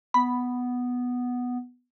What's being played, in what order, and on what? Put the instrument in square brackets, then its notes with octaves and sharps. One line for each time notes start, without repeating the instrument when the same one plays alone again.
[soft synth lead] B3 [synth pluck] B5